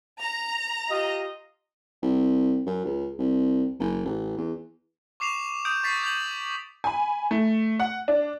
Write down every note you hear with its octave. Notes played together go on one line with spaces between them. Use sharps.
A#5
F4 G4 D#5
C2
F#2
C#2
C2
F#1
A1
E2
C#6 D6 C7 E7 F7
D#6 G6 D7
C#6 A6 B6 C7
G6 F7 F#7
G#5 B5
A3
F#5
D4